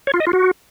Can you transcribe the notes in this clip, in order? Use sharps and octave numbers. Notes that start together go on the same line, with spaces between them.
C#5
F4
D#5
F4
F#4